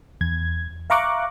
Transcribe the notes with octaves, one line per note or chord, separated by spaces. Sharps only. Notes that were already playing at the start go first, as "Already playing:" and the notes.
E2 G#6
E5 F5 A#5 C#6 D6 F#6